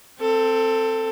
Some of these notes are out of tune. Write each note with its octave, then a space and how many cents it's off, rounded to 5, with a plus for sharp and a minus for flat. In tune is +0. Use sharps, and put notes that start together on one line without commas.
C4 +0 A4 +20